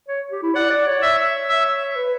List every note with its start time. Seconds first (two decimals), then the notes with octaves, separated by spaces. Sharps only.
0.08 C#5
0.32 G4
0.43 E4
0.55 D5 F#5
0.70 D5
0.87 C#5
1.02 E5
1.49 E5
1.96 B4